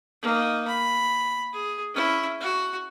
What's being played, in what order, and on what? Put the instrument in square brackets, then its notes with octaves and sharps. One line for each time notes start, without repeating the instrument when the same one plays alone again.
[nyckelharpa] A#3 D#4
B5
G#4
C#4 E4
F#4